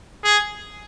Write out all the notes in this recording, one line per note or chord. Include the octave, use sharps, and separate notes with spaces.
G#4